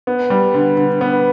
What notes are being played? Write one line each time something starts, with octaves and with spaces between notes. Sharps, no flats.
B3
G3
D3
D3
B3